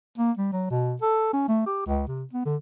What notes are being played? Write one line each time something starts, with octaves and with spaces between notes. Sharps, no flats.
A#3
G3
F#3
B2
A4
C#4
A3
G4
C#2
C3
B3
D3